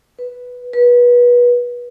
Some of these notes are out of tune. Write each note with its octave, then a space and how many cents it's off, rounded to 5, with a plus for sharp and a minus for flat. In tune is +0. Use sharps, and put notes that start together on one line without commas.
B4 +0
B4 -25